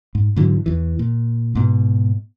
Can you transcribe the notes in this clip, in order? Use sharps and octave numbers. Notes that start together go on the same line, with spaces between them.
G#2
G#2 D3 E3 F#3
E2 E3
A#2
G#2 B2